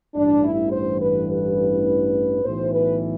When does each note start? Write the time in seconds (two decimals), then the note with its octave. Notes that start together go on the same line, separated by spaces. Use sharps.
0.15 A1 G2 E3 D4
0.43 E4
0.72 C5
1.01 B4
1.30 B4
2.44 B1 A2 E3 C5
2.72 B4